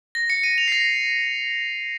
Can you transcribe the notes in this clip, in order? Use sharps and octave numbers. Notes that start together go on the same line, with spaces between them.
A#6
C#7
D#7
F7
C7
A#6